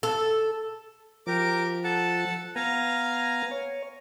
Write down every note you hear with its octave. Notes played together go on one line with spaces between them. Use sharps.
A4
F3 G4 A#4 D6
A4 F#5 A5
B3 F5 G#5 A#5
C#5